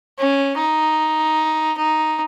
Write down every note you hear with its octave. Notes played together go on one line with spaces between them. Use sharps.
C#4
D#4
D#4